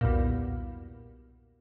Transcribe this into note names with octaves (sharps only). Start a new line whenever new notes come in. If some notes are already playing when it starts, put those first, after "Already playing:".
B1 E2 G2 A#2